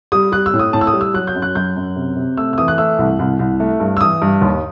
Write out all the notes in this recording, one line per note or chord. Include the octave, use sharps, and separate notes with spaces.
G3 D#6
G3 F#6
E6
A2
D#6
A2 A5
E6
D#6
G3
E6
F#3 F#6
G6
F#2
F#6
F#2 G6
F#2
C3
C3
A3 E6
E6
E3 D#6
F#6
A3 E6
C2
C2
C2
A3
G2
E6
E3 D#6
G2
D#2